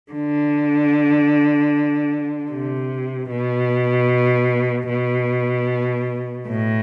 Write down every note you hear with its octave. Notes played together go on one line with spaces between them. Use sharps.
D3
C3
B2
B2
A2